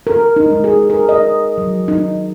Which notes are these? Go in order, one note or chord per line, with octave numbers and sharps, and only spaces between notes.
A#4
D#4
G#3
G#4
A#4
D#5
F#3
D#4